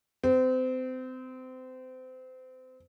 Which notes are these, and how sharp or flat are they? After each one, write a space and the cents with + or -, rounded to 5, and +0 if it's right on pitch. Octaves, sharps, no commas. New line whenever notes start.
C4 -30